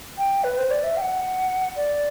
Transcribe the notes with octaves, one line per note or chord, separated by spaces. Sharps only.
G5
B4
C5
D5
E5
G5
F#5
D5